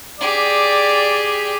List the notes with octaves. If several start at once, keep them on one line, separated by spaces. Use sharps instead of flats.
G4 G#4 D5